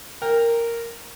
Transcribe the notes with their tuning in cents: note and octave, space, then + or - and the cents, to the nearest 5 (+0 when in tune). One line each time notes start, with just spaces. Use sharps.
A#4 -5 G5 +20